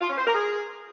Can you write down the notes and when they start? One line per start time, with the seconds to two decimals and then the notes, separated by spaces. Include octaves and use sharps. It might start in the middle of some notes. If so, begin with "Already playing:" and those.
0.01 F4
0.09 C#4
0.18 C5
0.26 A#4
0.35 G#4